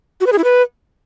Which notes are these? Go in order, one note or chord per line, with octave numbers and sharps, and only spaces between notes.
F#4
B4
G#4
E4
B4